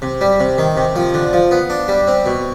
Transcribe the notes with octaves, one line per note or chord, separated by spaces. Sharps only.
C3
G3
C3
D#3
C3
F3
D3
F3
B3
D4
G3
C4
B2